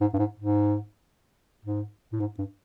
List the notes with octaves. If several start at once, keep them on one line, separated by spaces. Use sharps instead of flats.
G#2
G2
G#2
G#2
G#2
A2
G#2
G2